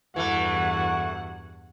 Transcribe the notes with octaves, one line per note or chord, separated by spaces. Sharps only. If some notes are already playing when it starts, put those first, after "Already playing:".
E2 G2 E3 A3 F#4 F#5